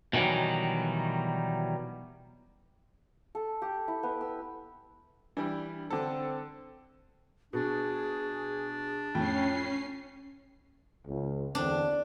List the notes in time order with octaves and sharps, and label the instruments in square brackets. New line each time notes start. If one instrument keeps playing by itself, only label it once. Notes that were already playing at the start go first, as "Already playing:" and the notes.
[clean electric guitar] B2 D#3 E3 F#3 G3
[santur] A4
G4
E4
B3
E6
[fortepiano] E3 G3 [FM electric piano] D4
[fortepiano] D3 A4 [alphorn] C4
[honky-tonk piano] B2 [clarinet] D4 [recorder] G#4
[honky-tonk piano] F2 A2 G5 [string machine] C#4 C7
[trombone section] C#2
[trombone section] E2 D3 C4 [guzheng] D4